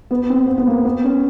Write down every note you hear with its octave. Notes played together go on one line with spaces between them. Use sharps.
B3
C4
B3
B3
A#3
B3
C#4